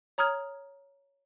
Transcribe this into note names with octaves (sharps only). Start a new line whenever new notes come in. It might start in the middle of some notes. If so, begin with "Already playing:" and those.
C#5 A#5 D#6 F6 G#6